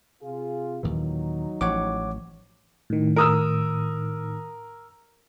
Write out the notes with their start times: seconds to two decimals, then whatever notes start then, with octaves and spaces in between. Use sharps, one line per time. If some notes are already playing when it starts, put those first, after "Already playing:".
0.22 C3 F4 G#4
0.83 D#2 A#2 E3 F#3 D#4
1.61 A1 F3 C#5 F#5 D6
2.90 A2 D#3
3.16 A#4 D#6 E6